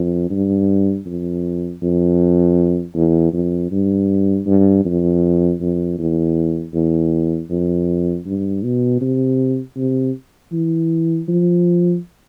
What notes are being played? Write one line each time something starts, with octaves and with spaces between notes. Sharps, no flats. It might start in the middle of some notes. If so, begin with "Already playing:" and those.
Already playing: F2
G2
F2
F2
E2
F2
G2
G2
F2
F2
E2
E2
F2
G2
B2
C3
C3
E3
F3